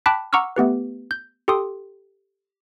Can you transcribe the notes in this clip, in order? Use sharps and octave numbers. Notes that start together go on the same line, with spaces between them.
G5 A5 B5 D6 F#6 B6
F#5 A#5 C#6 D6 E6 F6
A3 B3 G4 B4
G6
G4 A4 G5 C6 D#6